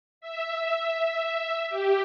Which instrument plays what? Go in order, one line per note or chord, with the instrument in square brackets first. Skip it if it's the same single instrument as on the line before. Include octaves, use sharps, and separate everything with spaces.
[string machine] E5
G4